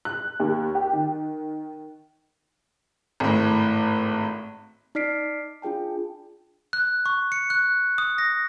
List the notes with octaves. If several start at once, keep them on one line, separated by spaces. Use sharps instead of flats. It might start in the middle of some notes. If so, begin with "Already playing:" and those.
F#6
D#2
G4
D#3
G#1 A2
D#4 D5 F6 B6 C7 D7
D4 F4 G#4 G5 A5
F#6
C#6
C#7
F#6
D#6
A#6